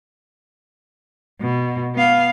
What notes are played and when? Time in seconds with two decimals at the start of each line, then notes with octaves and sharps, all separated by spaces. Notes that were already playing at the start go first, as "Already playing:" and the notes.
1.41 B2
1.95 B3 F5